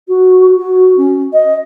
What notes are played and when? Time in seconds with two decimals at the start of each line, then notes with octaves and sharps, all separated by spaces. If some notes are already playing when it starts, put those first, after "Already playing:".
0.08 F#4
0.56 F#4
0.97 C#4
1.33 D#5